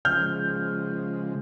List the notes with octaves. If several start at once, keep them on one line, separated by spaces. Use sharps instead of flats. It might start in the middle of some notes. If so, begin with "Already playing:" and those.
C#3 F3 G#3 F6 G6